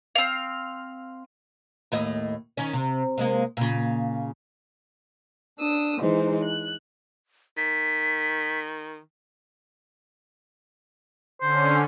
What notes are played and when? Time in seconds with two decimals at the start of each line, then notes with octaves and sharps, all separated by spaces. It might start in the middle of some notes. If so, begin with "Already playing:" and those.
0.15 C4 F5
1.92 D#2 A2 D#5
2.57 D#3 C#4
2.73 C3
3.18 C3 G#3 A#3
3.57 A#2 C#3
5.59 D4 D#6 E6
5.99 E3 G#3 D#4 C5
6.43 F#6
7.57 D#3 B6
11.41 D3 C#4 C5